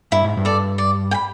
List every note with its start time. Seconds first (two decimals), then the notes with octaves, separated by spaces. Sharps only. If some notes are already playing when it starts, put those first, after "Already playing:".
0.12 G2 E4
0.24 G#2
0.37 G2
0.45 A4 D5
0.78 D5
1.11 G5
1.14 B5